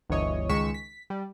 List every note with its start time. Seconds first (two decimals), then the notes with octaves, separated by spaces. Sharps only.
0.09 G1 D2 E3 C#5 D#5
0.49 C#2 D#3 G#3 C#6 B6 E7
0.74 B6
1.10 G3